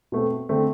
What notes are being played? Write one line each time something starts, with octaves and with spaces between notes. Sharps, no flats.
B2 A3 C4
D3 A3 C4